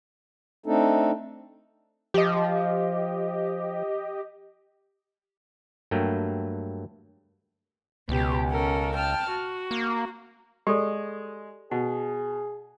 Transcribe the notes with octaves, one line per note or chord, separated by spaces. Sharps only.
A3 C4 D4 D#4 A4
F3 G4 D#5
G2 F#3 A3 A#3 G5
C#2 B2 G4
C#4 A4 A#4
G5 A5 F6
F#4
A#3
G#3 G4 A4 D5
B2 G#4 F#5